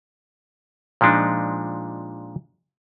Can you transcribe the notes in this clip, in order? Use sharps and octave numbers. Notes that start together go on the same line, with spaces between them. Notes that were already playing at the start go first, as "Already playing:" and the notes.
A#2 F3 G#3 D4 D#4